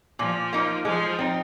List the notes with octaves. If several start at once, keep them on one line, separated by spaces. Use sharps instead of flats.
A#2 F3
A#3 D#4
F3 G#3
C4 D#4